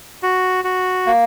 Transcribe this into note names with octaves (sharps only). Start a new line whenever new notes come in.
F#4
F#4
A#3